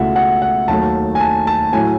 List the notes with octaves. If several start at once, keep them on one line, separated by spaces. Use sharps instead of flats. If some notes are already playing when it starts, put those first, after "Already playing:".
Already playing: C#2 B2 A3 E4 E5 F#5
F#5
F#5
D#2 D#3 F#3 A3 A5
G#5
A5
A5
A2 F#3 A3 E4 G#5